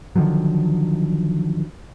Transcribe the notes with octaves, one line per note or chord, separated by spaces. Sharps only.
D3 D#3 F3 F#3